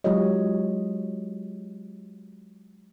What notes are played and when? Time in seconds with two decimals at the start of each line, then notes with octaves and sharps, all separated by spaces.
0.04 F#3 G#3 F4 G4 C#5 D#5